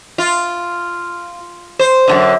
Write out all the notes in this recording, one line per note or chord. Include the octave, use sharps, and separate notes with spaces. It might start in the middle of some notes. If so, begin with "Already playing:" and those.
F4
C5
F#2 B2 D3